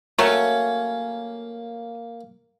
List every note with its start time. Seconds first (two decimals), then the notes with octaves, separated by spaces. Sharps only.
0.19 F#3 A3 A#3 C#4